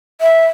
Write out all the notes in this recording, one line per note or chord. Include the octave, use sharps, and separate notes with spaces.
E5